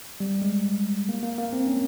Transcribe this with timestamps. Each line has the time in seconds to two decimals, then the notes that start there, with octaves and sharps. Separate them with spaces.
0.20 G3
0.42 G#3
1.09 A#3
1.23 A#3
1.38 A#3
1.53 C4
1.67 C#4